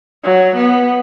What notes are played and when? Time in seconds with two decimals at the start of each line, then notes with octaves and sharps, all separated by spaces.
0.24 F#3
0.56 B3